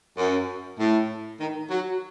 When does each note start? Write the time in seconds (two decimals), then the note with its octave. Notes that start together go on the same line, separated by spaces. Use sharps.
0.18 F#2
0.78 A2
1.41 D#3
1.71 F#3